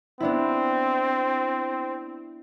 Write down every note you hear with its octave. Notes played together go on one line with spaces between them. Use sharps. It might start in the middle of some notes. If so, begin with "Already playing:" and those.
B3 C4 D4 E4